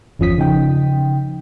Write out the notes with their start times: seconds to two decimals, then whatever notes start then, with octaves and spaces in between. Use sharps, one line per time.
0.19 G1 E2 F3 C#4 D#6 B6
0.38 C#3 F3 D#4 G5